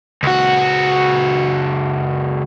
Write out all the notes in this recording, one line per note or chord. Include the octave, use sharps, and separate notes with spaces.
C#2 F#4